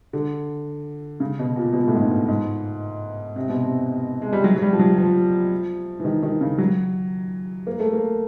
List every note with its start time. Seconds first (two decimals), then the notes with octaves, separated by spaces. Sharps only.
0.13 D3
1.20 C#3
1.39 B2
1.56 A#2
1.73 B2
1.80 A#2
1.88 A2
1.95 G#2
2.02 G2
2.28 G#2
3.36 C3
3.49 B2
3.63 C3
4.22 G#3
4.33 G3
4.44 F#3
4.56 F#3
4.62 G3
4.73 F3
4.79 F#3
4.98 F3
6.00 E3
6.05 D#3
6.23 D#3
6.41 C#3
6.58 F#3
7.67 A#3
7.80 A3
7.93 A#3